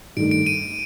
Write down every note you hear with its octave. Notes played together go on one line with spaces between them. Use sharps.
G2 D#3 A3 D7
D7
D#7